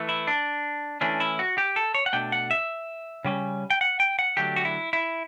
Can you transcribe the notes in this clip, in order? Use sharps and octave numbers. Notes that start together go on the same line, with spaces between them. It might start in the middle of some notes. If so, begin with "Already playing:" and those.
Already playing: E3 A3
E4
D4
E3 A3 C#4 D4
E4
F#4
G4
A4
C#5
F#5
B2 A3 D4 G5
F#5
E5
C#3 G3 C#4
G5
F#5
G5
F#5
D3 F#3 A3 D4 G4
F#4
E4
E4